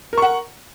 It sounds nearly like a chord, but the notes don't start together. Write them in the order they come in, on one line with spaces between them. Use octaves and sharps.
A#4 C#6 F#5